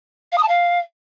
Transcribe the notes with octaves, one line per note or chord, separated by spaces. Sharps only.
F5
D#6
A5
F5